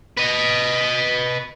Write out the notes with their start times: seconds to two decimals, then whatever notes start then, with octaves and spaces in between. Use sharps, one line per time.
0.18 B4 D#5